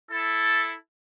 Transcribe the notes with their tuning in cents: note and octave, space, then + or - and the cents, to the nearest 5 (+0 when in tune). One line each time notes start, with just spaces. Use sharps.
E4 +0 A4 +0